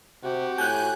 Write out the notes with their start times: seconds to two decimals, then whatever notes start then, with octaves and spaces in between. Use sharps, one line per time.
0.23 C3 F#4 G4
0.58 A2 G#5 F#6 G6